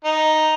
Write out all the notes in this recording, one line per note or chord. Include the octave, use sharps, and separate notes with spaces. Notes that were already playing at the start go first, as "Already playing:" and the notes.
D#4